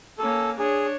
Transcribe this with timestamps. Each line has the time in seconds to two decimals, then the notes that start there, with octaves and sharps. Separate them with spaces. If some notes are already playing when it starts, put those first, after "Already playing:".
0.18 A#3 C#4 A4
0.59 D4 G#4 C#5